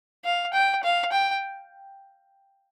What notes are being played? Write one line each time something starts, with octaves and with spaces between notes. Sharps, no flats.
F5
G5
F5
G5